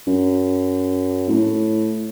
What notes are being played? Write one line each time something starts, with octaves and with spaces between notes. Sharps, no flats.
F#2
A2